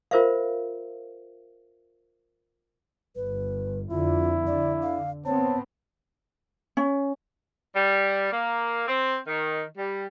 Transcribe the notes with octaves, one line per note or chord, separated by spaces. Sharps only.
F4 A#4 C5 E5 F5
G1 B4
F2 D3 E4 F4
D3 D5
F5
B3 C4 C#5 A5
C#4
G3
A#3
C4
D#3
G3